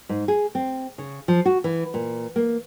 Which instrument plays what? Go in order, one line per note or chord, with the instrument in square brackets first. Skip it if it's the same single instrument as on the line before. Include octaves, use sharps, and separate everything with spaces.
[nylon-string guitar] G#2
G#4
C4
C#3
F3
F#4
E3
A#2
A#3